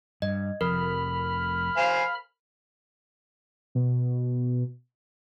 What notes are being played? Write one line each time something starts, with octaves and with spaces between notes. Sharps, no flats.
G2 D#5
F1 F2 A#4 B5 F6
C5 F5 G#5
B2